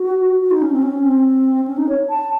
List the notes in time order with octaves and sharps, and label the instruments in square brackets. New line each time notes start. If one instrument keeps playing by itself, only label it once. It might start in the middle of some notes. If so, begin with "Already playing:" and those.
Already playing: [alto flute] F#4
F#4
D#4
C#4
C4
C#4
C4
C#4
D#4
C#5
A5